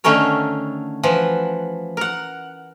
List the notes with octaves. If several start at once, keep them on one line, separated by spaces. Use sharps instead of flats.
D3 D#3 A3 C#4 A#4 C#5
E3 F3 F#5
A#4 F#5